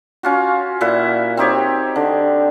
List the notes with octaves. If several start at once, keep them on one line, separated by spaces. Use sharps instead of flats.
C#4 F4 F#4
A#2 E4 E5 F#5
C4 D#4 G4 C#5
D3